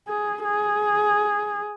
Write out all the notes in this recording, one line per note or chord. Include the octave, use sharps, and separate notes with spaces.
G#4
G#4